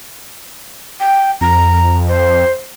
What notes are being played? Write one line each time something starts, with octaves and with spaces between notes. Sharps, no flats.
G5
F2 A#5
C5